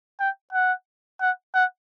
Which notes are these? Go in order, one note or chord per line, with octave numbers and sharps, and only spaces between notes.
G5
F#5
F#5
F#5